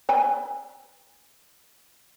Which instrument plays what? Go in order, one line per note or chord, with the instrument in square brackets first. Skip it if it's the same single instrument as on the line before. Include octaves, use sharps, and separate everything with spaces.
[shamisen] B4 G#5 B5